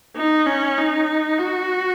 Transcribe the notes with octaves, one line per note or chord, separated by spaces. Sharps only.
D#4
C#4
D#4
F#4